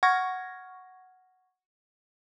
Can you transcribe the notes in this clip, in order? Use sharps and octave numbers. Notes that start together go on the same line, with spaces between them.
F#5 C#6 F6 G#6 A#6